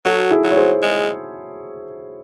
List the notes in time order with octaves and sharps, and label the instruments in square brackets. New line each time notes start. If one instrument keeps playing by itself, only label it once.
[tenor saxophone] F#3 [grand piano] F#4 A4
[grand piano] E4 G#4
[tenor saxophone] F#3
[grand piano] C#5
G#4 C5
[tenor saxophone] G#3